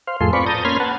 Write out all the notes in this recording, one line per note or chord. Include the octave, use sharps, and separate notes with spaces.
C5 F5
F2 A2 F4 G#4 A4 C6
C4 F4 B4 D5 B5 C#6
A5 A#5 D#6 G6
A#3 C#4 B5 C6 F6 G#6
B4 F#5 A5